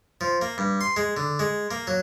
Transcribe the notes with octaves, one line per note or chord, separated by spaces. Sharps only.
F3
A#3
G2
C6
G#3
D3
G#3
A#3
F#3